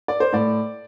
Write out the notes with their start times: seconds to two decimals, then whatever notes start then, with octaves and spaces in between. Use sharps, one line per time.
0.08 D5
0.20 C5
0.33 A2 D5